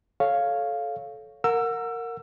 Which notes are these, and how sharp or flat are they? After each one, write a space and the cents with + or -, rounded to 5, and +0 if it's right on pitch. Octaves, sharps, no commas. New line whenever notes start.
A4 -20 C#5 +0 F5 +0
A#4 -15 F#5 -25 E6 +25